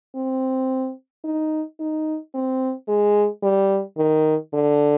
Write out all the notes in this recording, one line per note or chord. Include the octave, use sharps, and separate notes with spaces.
C4
D#4
D#4
C4
G#3
G3
D#3
D3